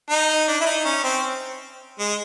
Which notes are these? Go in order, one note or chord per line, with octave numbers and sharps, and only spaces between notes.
D#4
D4
E4
D#4
C#4
C4
G#3